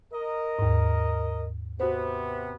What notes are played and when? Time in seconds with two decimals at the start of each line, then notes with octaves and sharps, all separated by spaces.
0.13 A#4 D#5
0.59 D#2 G#2
1.80 C3 B3 F#4 C5